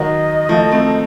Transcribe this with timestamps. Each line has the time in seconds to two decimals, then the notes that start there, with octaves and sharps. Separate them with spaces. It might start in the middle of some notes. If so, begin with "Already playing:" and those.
Already playing: D#3 F#3 D#5
0.49 F3 A3
0.71 A3 C4